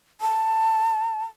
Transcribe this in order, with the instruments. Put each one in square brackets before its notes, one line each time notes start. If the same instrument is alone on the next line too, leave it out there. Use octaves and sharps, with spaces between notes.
[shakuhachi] A5